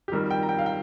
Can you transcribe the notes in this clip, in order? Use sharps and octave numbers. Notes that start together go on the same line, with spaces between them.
G4
F2 D#3 G3 A#4
G5
A#5
G5
F5
G5